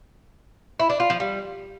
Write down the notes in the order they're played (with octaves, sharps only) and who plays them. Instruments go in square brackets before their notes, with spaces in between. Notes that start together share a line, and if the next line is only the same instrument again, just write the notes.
[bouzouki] E4
D4
F4
F3
G3